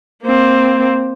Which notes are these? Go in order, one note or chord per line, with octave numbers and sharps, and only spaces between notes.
A#3 C4